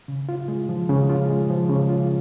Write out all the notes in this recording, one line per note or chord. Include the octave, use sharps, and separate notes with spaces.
C#3
F4
G#3
F3
C#3
F4
G#3
F3
C#3
F4